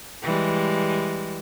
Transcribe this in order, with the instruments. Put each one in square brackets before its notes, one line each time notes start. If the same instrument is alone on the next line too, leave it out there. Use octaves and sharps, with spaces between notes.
[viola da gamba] E3 G3 G#3